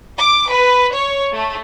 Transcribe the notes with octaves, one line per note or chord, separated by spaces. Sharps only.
D6
B4
C#5
A3